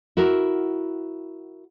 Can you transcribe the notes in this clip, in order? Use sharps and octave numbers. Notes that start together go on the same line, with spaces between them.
E4 F#4 A#4